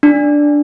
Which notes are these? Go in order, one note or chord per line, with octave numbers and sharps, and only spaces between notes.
D4